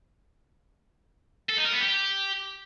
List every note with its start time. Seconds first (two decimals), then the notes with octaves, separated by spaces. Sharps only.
1.50 A4
1.57 D#4
1.65 A#4
1.73 B3
1.81 G4